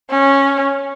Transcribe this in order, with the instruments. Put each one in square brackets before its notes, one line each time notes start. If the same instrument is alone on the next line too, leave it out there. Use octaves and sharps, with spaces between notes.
[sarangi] C#4